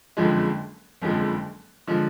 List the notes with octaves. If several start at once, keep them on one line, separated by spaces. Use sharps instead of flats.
F#1 F2 D3 F3 G#3
F#1 F2 D3 F3 G#3
D3 F3 G#3